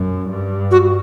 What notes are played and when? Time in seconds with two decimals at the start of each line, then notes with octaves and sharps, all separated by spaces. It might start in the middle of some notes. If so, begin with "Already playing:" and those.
Already playing: F#2
0.30 G2
0.71 F#4